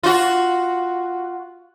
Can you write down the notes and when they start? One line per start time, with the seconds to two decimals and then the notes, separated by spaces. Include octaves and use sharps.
0.03 F4 F#4